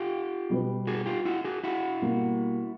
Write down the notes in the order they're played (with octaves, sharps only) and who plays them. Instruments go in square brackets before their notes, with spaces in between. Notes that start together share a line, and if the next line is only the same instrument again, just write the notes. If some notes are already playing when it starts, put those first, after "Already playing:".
Already playing: [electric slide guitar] F4 G4
[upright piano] B2 G3 B3
[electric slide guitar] F#4 G#4
F4 G4
E4 F#4
F#4 G#4
E4 F#4
[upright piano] B2 G3 A#3